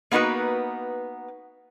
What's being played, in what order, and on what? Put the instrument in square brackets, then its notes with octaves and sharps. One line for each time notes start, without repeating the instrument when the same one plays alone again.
[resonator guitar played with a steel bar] A#3 B3 D#4 F#4 B4